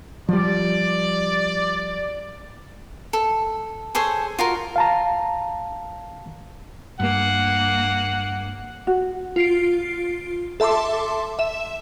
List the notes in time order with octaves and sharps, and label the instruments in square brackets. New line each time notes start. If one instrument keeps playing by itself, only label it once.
[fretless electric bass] F3 G3 [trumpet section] D5
[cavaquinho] A4
G#4 A4 C5 C#5
F4 F#4 A#4
[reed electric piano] F5 A5 A#5
[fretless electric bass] G2 [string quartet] A#3 [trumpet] F#5
[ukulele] F#4
[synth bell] F4 C7 D7
A4 E5 A5 C6 D6
E5 E7